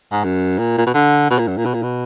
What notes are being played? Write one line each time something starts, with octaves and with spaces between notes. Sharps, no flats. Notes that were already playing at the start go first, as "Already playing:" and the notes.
G#2
F#2
A#2
A#2
B2
D3
B2
A#2
F#2
A#2
B2
A#2
B2